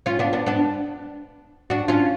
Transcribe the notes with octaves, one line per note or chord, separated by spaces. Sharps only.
C#4 F4
B3 D4
B3 D4
B3 D4
D4 F#4
C#4 F4